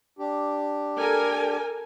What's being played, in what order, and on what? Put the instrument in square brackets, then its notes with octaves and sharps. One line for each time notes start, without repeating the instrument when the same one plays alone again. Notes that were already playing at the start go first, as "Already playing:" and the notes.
[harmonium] D4 G4
[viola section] A4 A#4 G#5